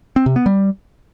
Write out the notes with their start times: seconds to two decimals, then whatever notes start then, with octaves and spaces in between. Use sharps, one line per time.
0.16 C4
0.26 C3
0.36 B3
0.46 G3